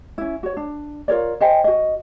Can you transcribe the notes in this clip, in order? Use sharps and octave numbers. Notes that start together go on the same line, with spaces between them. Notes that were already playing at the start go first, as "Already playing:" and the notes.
C#4 E4
F#4 C#5
D4
F4 A#4 C#5 D5
C5 D#5 G5 G#5
F#4 D#5